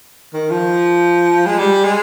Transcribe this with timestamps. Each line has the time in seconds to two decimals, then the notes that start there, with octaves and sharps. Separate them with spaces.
0.33 D#3
0.50 F3
1.47 G#3
1.59 G3
1.84 G#3